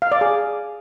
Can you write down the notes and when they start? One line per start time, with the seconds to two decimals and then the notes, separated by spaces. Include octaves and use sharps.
0.02 F5
0.12 D5
0.21 G#4